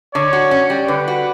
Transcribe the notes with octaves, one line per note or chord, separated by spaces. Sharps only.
D3 C#5
F#4
C#4
G3
D3 B4
F#4